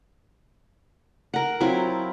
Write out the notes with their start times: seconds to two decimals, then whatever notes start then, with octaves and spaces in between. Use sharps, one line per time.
1.34 A#4 F#5
1.60 F#3 C4 E4 F4